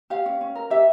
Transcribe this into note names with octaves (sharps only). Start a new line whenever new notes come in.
G4 F5
C#4
C#4
A#4
G4 E5